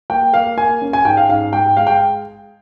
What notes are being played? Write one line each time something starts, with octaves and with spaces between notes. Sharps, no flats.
A#3 G5
A#3 F5
A#3 G#5
C#4
G#5
G#2 G5
F5
G#2 F5
G#3 G5
G#3 F5
G5